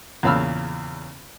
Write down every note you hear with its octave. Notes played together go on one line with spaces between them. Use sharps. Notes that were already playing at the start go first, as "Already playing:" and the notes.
E2 A#2 C#3 B5 E6 F6